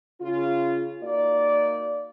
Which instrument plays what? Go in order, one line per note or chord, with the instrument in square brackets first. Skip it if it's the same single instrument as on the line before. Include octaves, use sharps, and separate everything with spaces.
[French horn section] C#3 F4
A#3 D#4 F#4 D5